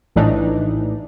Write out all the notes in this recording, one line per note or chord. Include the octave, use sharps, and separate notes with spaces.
A#1 A2 E3 D4 D#4